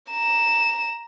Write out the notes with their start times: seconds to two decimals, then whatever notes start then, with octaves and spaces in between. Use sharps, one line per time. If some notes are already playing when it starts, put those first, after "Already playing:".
0.11 A#5 E7